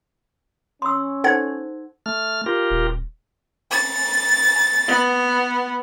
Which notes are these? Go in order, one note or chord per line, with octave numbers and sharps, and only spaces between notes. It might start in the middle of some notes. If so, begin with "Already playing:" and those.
C#4 C6 E6
D#4 A4 C5 F#5 G#6
A3 F6
F4 G4 A#4
D#1
A6
B3